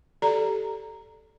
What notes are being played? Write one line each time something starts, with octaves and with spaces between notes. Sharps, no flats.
G4 A4 D5 A#5